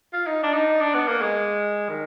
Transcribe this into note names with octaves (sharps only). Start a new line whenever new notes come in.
F4
D#4
D4
D#4
D4
B3
A#3
G#3
D#3